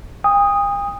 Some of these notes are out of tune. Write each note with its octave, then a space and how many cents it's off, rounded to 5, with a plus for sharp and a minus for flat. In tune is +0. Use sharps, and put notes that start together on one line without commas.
G5 +45 D#6 +0